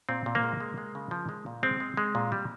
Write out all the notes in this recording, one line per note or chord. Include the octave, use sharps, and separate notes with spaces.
A#2 C4
A#2
A#3
G#3
G#3
G#3
C#3
F3
G#3
A#2
G#3 C4
G#3
G#3
A#2
G3